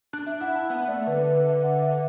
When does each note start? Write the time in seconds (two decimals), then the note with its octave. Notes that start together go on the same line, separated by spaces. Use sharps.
0.13 D4 F#6
0.27 E5
0.41 E4 F#5
0.55 A5
0.69 B3 F#5
0.83 E5
0.88 A3 D5
1.07 D3 B4
1.26 B4
1.44 E5
1.63 F#5
1.82 E5